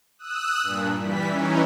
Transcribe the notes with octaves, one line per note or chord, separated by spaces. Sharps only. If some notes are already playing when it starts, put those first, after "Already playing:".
D#6 E6 F#6
G2 A#2
E3 G3 B6
E3 C#4 D#4